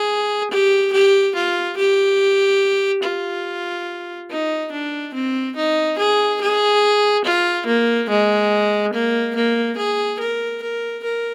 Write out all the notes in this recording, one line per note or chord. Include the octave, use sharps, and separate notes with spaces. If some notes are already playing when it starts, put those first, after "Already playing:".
Already playing: G#4
G4
G4
F4
G4
F4
D#4
D4
C4
D#4
G#4
G#4
F4
A#3
G#3
A#3
A#3
G#4
A#4
A#4
A#4